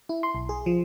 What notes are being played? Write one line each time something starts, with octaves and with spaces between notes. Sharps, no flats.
E4
C6
B1
G#4
F3